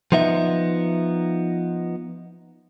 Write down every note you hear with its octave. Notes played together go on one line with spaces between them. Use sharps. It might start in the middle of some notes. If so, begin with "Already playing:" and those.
F3 B3 D#4 E5